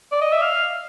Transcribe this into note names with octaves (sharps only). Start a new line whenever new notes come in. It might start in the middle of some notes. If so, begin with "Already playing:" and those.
D5
D#5
E5
F5